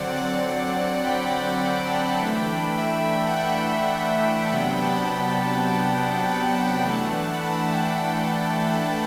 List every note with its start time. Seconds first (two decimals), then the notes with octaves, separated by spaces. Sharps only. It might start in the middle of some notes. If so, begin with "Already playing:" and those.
Already playing: D3 F#3 C4 D5 F#5
0.16 D5 F#5
1.04 G5 B5
1.61 G5 B5
1.72 G5
1.82 A5
1.91 G5 B5
2.20 E3 A3 D4
2.78 E5 G5
3.27 F#5
3.36 E5 G5
4.46 A5
4.52 C3 F#3 B3 D4 G5 B5
4.82 F#5 A5
6.27 G5 B5
6.56 F#5 A5
6.85 E3 A3 D4
7.33 B5
7.43 F#5 A5
7.73 G5 B5
8.60 B5
8.73 A5
8.87 G5